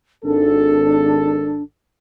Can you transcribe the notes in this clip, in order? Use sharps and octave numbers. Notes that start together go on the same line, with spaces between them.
G#1 D4 A4